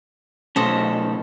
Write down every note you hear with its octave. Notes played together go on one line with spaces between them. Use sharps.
B2 A3 C#4 A4 C5 D#5